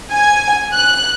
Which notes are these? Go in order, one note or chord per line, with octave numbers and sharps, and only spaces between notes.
G#5
F#6